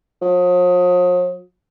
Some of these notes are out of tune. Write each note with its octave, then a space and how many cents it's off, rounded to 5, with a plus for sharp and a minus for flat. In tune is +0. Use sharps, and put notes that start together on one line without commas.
F3 +45